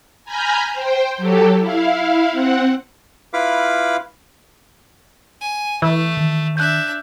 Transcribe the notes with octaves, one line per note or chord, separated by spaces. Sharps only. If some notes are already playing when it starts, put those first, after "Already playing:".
G#5 A#5 B5 F6 G6
C5 G5
F#3 G4 A4
E4 F5
C4 F#5
E4 F4 B4 F5 B5 D6
G#5
E3 A3
D#3
D4 E5 F#6 G6